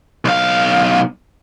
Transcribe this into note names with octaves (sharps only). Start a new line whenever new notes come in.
B1 F5